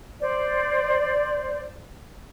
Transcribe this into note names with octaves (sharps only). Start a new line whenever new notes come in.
C5 D5